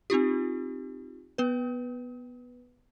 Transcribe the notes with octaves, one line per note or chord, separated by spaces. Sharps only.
C4 D#4 F4 G4
B3 B4